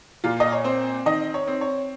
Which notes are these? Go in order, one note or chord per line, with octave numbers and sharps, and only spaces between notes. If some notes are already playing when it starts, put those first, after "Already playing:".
A#2 F4
D#5
C#5
C4 C5
D#3 D#5
C#5
C4
C#5